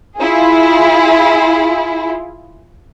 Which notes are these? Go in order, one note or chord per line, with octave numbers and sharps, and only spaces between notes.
E4 F4 G#4